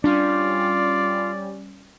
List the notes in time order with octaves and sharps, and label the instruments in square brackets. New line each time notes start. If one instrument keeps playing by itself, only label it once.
[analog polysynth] G3 C#4 [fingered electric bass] D4 [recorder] F4 [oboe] D5